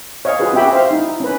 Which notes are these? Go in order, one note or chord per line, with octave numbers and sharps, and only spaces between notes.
C#5 D#5 F5
F4 F#4 G#4 B4
C#4 F#4 G4 E5 G5 B5
C5 E5 F5
D#4 E4
C#4 B4